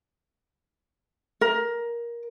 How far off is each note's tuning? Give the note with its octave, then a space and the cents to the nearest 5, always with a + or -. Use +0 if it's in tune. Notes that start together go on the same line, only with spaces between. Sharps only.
A#4 +15